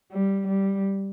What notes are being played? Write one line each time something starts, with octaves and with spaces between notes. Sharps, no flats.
G3
G3